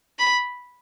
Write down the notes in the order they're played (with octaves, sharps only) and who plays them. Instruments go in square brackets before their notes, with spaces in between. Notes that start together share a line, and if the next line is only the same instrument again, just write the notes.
[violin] B5